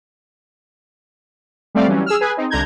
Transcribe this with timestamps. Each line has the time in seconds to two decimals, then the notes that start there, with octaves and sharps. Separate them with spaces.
1.75 G3 A3 C4 D5 F5
1.87 E3 F#3 G3 C#4
2.06 G#4 E6 F6
2.21 G#4 B4 G#5
2.37 C4 D#4
2.50 C2 D3 A#5 G6 G#6